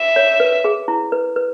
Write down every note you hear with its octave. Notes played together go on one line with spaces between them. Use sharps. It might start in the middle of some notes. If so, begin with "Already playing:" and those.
Already playing: E5
C#5
B4
G#4
E4
B4
B4